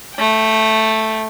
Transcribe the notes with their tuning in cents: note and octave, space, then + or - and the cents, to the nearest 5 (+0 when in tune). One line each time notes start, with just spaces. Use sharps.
A3 +0 G5 +0